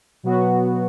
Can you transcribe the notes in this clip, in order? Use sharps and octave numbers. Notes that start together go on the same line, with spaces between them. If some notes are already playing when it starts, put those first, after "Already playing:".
B2 F#3 B3 F#4